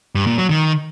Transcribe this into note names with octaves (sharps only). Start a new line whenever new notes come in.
G2
A#2
F#3
D#3